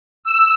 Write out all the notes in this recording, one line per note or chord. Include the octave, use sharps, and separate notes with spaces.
E6